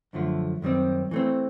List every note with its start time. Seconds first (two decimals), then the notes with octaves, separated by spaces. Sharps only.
0.13 F#2 D3 F3 A3
0.62 F#2 D#3 G3 C4
1.11 E3 A3 C4